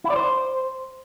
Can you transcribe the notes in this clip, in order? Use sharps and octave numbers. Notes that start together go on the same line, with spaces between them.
E4
D5
C5